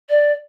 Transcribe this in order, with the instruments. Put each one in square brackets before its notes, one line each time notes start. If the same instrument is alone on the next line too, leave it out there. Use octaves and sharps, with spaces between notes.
[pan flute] D5